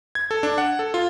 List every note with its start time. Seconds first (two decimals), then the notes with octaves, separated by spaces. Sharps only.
0.15 G#6
0.31 A4
0.43 D4
0.58 F#5
0.79 A4
0.94 F4